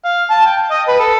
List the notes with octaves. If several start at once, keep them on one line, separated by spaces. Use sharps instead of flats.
F5
A5
G5
D#5
B4
A4